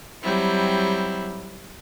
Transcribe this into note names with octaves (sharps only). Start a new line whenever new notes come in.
F#3 G3 C4 E4